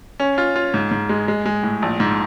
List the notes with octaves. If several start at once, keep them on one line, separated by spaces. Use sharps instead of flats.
C#4
F4
F4
G#2
G#2
G#3
G#3
G#3
A2
A#1
G#2